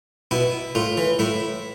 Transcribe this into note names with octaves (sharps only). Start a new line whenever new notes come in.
B2 E4
A2 F4
E3
A2 E4